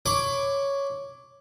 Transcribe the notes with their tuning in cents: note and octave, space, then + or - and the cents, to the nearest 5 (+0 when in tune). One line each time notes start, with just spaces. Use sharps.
C#5 +0 B5 +35 D6 +0